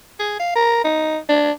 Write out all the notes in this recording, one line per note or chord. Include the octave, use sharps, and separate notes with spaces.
G#4
F5
A#4
D#4
D4